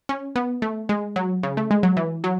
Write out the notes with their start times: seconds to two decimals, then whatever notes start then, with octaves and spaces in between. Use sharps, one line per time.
0.09 C#4
0.36 B3
0.62 A3
0.89 G#3
1.16 F#3
1.43 C#3
1.57 A3
1.71 G#3
1.83 F#3
1.97 E3
2.24 F#3